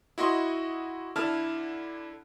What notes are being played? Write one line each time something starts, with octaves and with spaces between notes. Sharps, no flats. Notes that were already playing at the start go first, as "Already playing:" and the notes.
E4 F#4 D#5 C6
D3 E4 A5 F6